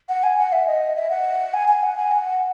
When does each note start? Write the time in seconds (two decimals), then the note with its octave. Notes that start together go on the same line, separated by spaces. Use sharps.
0.09 F#5
0.23 G#5
0.38 F#5
0.52 E5
0.67 D#5
0.95 E5
1.10 F#5
1.54 G#5
1.68 G#5
1.83 F#5
1.97 G#5
2.11 F#5